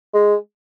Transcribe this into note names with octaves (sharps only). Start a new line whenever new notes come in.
G#3